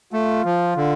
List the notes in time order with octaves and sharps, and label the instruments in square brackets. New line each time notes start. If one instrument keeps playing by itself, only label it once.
[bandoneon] A3 [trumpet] F4
[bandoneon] F3
D3